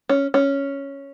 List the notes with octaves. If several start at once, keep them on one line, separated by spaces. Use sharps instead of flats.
C#4
C#4